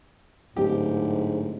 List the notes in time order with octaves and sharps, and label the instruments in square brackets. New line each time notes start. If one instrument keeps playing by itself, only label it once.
[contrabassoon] D1 [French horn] G#2 [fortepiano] G4